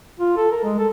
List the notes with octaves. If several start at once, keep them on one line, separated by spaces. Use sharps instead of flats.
F4
A4
A#4
G#3
A4